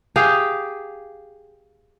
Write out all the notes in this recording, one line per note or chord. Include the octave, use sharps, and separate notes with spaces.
G4 G#4 F5